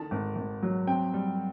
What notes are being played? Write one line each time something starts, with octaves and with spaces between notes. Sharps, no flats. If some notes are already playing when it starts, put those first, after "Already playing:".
Already playing: D3 D#3 A5
G#1
G#1
F#3
C4 G5
G3